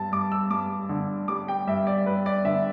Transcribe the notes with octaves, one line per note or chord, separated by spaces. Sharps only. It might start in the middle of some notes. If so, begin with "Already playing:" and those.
Already playing: G2 A5
G2 D6
E6
G2 D6
D3
G3 D6
G5
G2 E5
D5
G2 B4
D5
D3 E5